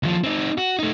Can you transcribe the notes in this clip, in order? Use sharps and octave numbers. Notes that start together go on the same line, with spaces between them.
D#2 F3
C4 D#4
F#4
A3 D#4